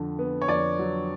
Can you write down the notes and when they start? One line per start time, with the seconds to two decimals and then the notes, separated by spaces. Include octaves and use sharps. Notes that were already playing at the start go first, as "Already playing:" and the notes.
Already playing: F2 D3
0.19 B3
0.42 C#5
0.48 F2 D5
0.79 F#3